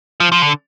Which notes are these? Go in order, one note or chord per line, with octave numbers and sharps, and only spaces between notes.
F3
F3
D3